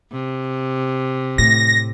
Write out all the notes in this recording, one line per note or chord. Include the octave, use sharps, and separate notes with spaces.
C3
A2 A#6